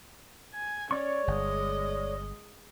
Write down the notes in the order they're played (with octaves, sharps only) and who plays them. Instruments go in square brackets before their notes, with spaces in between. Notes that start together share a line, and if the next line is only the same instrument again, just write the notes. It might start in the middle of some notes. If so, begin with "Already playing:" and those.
[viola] G#5
[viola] C#4 [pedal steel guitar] C#5 D5 C#6
[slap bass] G1 [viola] G#3 D#5